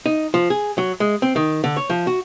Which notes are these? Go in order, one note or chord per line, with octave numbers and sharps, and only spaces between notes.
D#4
F3
G#4
F#3
G#3
C4
D#3
D3
C#5
F3
F#4